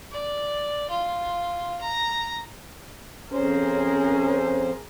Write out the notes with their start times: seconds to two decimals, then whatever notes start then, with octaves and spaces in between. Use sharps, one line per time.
0.11 D5
0.90 F4
1.81 A#5
3.32 F2 C#4 G#4 A#4 C5